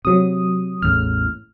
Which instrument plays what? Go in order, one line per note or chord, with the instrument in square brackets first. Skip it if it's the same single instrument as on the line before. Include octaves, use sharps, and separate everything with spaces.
[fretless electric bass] C3 [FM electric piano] F#3 D#6
[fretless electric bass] A1 E2 A2 [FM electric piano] F6